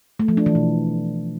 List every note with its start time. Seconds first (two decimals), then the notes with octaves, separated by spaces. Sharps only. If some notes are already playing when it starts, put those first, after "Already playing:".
0.19 A3
0.28 F3
0.37 D4
0.46 E3
0.55 B2